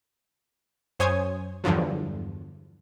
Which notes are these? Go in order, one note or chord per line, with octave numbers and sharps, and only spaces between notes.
F#2 C5 C#5 G#5 D#6 G#6
E2 G2 D3 F3 F#3